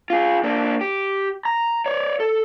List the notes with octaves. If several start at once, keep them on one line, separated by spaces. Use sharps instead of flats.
F4 G#4
A#3 D4
G4
A#5
C#5 D5
A4